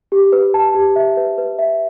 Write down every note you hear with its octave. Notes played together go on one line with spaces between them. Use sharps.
G4
B4
A5
G4
E5
B4
B4
E5